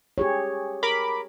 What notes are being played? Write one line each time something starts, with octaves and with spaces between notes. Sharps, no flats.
G4 G#4 C#5
A#4 B5 D6